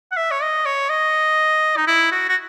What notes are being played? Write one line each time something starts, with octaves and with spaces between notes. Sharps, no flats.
F#5
E5
C#5
D#5
C#5
D#5
D#4
E4
F#4
F#4